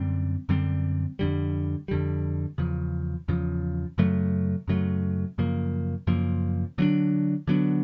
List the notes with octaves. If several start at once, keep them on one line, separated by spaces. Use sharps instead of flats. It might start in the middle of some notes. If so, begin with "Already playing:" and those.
Already playing: F#2 D3 G3 C4
F#2 D3 G3 C4
F2 D3 G3
F2 D3 G3
E2 C#3 F3
E2 C#3 F3
F#2 C#3 F#3 A3
F#2 C#3 F#3 A3
F#2 C#3 F3 A#3
F#2 C#3 F3 A#3
D3 F#3 B3 D4
D3 F#3 B3 D4